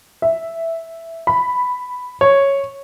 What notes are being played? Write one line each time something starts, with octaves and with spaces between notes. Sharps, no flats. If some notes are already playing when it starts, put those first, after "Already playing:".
E5
B5
C#5